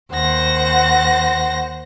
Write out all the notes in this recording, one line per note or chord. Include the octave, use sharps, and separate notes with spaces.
D#2 C5 F#5 A#6